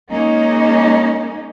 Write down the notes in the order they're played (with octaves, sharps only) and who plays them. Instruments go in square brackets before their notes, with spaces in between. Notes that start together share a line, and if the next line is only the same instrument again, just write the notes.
[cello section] G#3 A#3 C#4 D#4